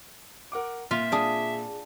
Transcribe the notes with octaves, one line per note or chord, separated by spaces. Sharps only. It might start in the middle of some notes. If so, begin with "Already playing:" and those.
A#4 F#5 D6
A#2 F4 E5
D4 G#4